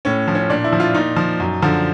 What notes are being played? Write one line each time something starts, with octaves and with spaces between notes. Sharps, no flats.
A2 C#4
F3
C#4
A#2 D4
E4
F3
F4
A#2 D#4
F3
F#2
D3 F3